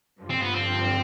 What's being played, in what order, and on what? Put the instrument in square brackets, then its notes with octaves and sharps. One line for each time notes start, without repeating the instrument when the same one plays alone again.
[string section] G2 D3 F3
[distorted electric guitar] C4
B3
C4